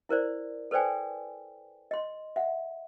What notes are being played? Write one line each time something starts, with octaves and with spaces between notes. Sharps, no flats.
E4 A#4 C5 D5
A4 B4 C5 D5 G5 G#5
D#5 C6
E5 F#5